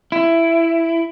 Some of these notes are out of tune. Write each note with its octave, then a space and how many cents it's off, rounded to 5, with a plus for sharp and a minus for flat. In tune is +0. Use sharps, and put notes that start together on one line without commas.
E4 +10